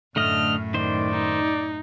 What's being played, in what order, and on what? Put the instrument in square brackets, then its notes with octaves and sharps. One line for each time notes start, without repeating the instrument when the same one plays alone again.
[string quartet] F#2 A2 [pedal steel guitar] D3 A3 D#5 [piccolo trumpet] F6
[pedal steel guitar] D#3 C5 [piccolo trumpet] D5
[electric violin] D#4